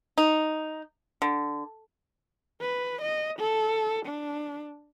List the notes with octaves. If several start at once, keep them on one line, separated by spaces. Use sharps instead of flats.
D#4
D3
B4
D#5
A4
D4